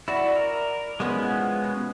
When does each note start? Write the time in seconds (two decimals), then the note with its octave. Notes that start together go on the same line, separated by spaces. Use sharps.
0.08 E4 F#4 D5
0.36 A#4
1.00 F3 G#3 B3 C#4 E4 F#4
1.64 B2